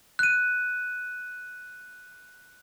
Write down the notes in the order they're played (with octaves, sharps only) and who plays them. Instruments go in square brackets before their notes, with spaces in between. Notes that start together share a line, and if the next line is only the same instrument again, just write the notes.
[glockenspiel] F#6 D#7